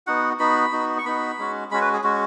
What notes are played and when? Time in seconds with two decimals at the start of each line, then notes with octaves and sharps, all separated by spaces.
0.07 B3 D#4 F#4 F#5
0.39 B3 D#4 F#4 B5
0.72 B3 D#4 F#4
0.98 C#6
1.06 B3 D#4 F#4 B5
1.38 G#3 C#4 F#4
1.71 G#3 C#4 F#4 B5
1.82 B4
1.93 G#4
2.04 G#3 C#4 F#4